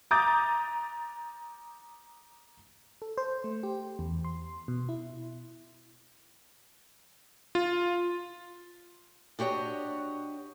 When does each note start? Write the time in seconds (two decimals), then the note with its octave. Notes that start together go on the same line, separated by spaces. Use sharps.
0.11 A#5 D6 D#6 G6 A6
3.02 A4
3.18 C5
3.44 A3
3.63 G4
3.99 E2
4.24 C6
4.68 B2
4.89 E4
7.55 F4
9.39 D4 F#4 G4 C#5 D#5